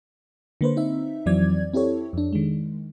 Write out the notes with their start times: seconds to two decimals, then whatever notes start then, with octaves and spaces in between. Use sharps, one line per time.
0.61 D3 A#3 B4 C5
0.76 C4 D#4 E5
1.26 F2 E3 F#3 C4 D5 G#6
1.73 C4 E4 G4 A4 C#5
2.13 F2 D4
2.33 D#3 G#3